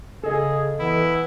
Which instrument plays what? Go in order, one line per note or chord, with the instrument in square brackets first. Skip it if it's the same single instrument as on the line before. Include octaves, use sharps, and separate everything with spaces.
[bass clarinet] C#3 [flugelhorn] G#4 [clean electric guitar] A4 D#5
[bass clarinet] E3 [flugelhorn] B3 [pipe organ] E4